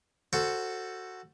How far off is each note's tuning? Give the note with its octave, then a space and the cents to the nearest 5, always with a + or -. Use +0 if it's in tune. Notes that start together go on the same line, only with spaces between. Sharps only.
F#4 +0 A4 +10 C5 +0